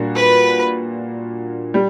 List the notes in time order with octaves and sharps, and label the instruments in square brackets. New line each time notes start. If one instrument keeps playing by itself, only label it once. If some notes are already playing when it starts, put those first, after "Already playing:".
Already playing: [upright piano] A#2 G3 A#3 D4 F#4
[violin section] B4
[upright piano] G3